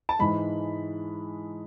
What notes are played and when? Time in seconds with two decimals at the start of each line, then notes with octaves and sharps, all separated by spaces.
0.09 A5
0.19 G#2 E3 G#3 B5